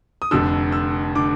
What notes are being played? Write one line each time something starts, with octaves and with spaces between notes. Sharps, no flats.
D#6
F1 F2 D3 E6
E6
D3 D6